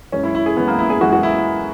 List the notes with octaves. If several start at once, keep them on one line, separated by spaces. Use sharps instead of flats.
F#2 E3 G#3 C#4
E4
E4
G#4
F#2 E3 G#3 B3
A#3
E4
G#4
F#2 E3 G#3 F#4
F#4
E4